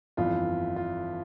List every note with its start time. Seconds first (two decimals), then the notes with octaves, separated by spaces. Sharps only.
0.17 G1 F2 E3 F4
0.76 F4